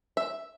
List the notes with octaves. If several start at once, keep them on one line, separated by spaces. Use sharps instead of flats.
E5